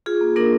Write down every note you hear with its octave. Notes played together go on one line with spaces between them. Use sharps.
F4 G#4
A#3
A#3 D4 A#4